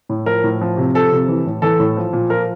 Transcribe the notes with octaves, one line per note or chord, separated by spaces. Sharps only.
A2
F3 A#4
A2
F3
C3
F3 A4
C3
E3
A2
E3 A4
A2
F3
A#2
F3 A#4